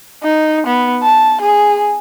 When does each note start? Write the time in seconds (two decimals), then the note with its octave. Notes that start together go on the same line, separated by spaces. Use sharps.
0.23 D#4
0.67 B3
1.03 A5
1.41 G#4